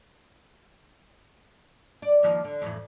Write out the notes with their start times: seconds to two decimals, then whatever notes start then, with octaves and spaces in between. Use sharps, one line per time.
2.02 D5
2.23 D#3 F3 A#3
2.44 D3
2.62 F2 A2 E3